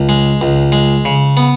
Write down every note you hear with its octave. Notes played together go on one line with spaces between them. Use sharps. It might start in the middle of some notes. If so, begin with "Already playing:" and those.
Already playing: C#2
G#3
C#2
G#3
C#3
B3